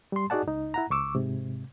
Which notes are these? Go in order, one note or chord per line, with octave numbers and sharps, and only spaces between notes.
G3 C6
D#4 F#4 G#4 D5 F#5 A5
C#2 D#4
E4 F#5 A#5
C#2 C#6 D6 E6
G#2 C3